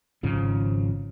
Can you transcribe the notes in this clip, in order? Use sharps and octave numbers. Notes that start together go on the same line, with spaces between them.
G#1 G#2 C#3 F3